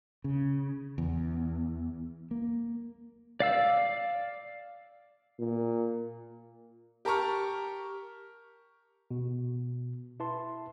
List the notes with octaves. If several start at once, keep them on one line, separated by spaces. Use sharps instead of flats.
C#3
E2
A#3
D5 F5 E6
A#2
G4 A#4 A5 A#5 C#6 F6
B2
E4 B4 A5 C6